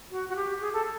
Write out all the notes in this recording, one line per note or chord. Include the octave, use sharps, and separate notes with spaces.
F#4
F#4
G4
G#4
A4